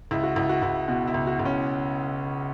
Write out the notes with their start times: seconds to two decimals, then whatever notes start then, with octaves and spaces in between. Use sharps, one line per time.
0.11 C#2 E4
0.23 F#4
0.36 C#2 E4
0.49 F#4
0.62 C#2 E4
0.88 B2 F#4
1.07 E4
1.14 C#2
1.27 F#4
1.39 C#2
1.45 C#4